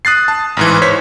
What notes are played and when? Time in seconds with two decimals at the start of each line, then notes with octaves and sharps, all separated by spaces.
0.05 D#6 F#6 A6 C7
0.28 A5
0.57 A1 G#2 E3
0.82 C5 C#5 G#6 B6